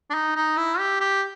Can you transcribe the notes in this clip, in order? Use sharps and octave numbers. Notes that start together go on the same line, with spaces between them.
D4
D#4
D#4
E4
G4
G4